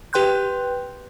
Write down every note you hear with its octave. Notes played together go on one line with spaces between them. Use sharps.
G4 B4 G5 C6 F#6 G6